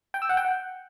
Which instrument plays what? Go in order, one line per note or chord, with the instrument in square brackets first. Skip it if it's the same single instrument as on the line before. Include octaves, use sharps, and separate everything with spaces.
[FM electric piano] G5
E6
F#5
G5
F#5